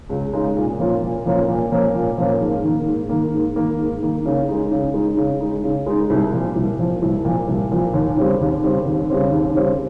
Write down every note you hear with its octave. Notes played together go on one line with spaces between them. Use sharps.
C#2
C#3 G#3 D#4
A#2
F3 A#3 C#4 F4
A#2
F3 A#3 C#4 F4
A#2
F3 A#3 C#4 F4
A#2
F3 A#3 C#4 F4
G#2
D#3 A#3
G#2
D#3 A#3
G#2
D#3 A#3
G#2
D#3 A#3
C#3
G#3 D#4
C#3
G#3 D#4
C#3
G#3 D#4
C#3
G#3 D#4
C2
A#2 F3
C2
A#2 F3
C2
A#2 F3
C2
A#2 F3
D#2
C#3 G3 C4
D#2
C#3 G3 C4
D#2
C#3 G3 C4
D#2
C#3 G3 C4